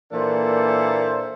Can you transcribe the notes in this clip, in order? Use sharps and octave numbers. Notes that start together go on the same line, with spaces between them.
A#2 E3 A#3 D4 A4 C5